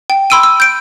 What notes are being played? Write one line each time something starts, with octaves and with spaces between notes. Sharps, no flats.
G5
B5 C6 E6 D7 D#7
E6
G6 D7